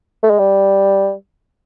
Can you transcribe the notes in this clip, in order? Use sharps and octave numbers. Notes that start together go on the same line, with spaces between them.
A3
G#3
G3